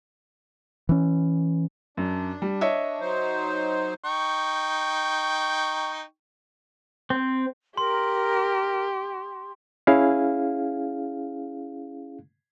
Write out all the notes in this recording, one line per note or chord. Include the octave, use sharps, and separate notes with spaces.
E3 C#4
F#2 D4
G3
C#5 D#5 E5
F#3 D#4 C5
D#4 G5 C#6
C4
G4 A#4 C6
C#4 E4 G#4 F5